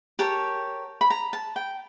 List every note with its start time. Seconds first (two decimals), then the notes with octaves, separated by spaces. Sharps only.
0.19 G4 A#4 C#5 A5
1.01 B5
1.10 A#5
1.33 A5
1.56 G5